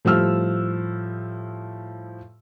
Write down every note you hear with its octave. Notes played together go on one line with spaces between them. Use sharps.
A2 F3 G3 E6 F6